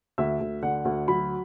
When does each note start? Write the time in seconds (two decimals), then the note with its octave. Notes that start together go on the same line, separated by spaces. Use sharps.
0.18 D2 E5
0.41 D2
0.63 D3 F#5
0.85 D2
1.08 F#3 B5